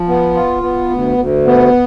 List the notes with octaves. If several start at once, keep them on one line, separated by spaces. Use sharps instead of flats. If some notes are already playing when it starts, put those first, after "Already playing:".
Already playing: F3
B3
F4
B3
D2
D2
B3